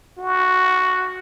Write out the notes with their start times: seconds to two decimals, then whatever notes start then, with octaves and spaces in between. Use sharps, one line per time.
0.18 F#4